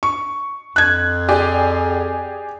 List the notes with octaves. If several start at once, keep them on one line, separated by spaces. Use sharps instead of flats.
C#6
F2 F#6 G#6
G4 G#4 D5